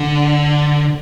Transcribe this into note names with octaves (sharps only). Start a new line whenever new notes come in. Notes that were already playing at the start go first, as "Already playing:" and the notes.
Already playing: D3